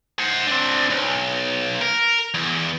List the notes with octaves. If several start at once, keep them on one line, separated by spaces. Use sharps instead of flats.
C5 F#5
C4 D4
B1
A#4
E2